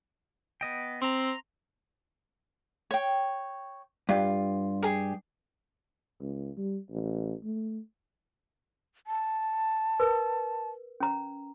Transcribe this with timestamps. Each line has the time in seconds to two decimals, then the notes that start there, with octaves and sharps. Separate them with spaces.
0.61 B3 D#5 G5
1.02 C4 A#5 C6
2.91 C#5 G5
4.09 G2 F4
4.83 G4 G#4 A#4
6.20 C#2
6.57 G3
6.90 A1
7.44 A3
9.07 A5
10.00 A#4 B4
11.00 C#4 A#5